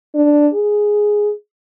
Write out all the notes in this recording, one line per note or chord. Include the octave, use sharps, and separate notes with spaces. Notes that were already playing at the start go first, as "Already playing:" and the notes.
D4
G#4